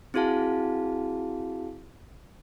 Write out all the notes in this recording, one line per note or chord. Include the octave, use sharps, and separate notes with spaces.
C4 E4 F#4 G#4 F5 A5